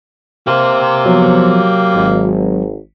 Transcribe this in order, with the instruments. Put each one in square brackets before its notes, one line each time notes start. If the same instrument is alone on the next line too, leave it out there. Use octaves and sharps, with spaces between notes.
[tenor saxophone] A#3 [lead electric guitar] G4 C5
[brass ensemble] F3 B3 [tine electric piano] F#3
[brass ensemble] G#1